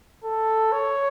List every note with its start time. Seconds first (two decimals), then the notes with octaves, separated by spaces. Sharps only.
0.24 A4
0.72 C#5